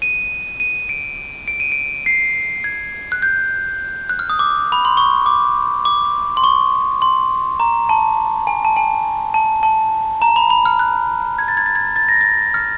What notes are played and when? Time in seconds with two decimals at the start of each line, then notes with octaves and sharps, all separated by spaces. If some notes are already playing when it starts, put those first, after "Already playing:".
0.02 D#7
0.60 D#7
0.89 D7
1.48 D7
1.60 D#7
1.72 D7
2.06 C7
2.64 G#6
3.12 F#6
3.22 G6
4.09 F#6
4.19 F6
4.30 D#6
4.39 D6
4.72 B5
4.85 C6
4.97 C#6
5.26 D6
5.85 D6
6.37 C6
6.44 C#6
7.02 C6
7.60 A#5
7.89 A5
8.47 G#5
8.65 A5
8.76 G#5
9.34 A5
9.63 A5
10.22 A#5
10.36 B5
10.50 B5
10.66 F6
10.79 F#6
11.39 G#6
11.48 A6
11.57 G#6
11.66 A6
11.75 G#6
11.96 A6
12.09 A#6
12.21 A6
12.54 F6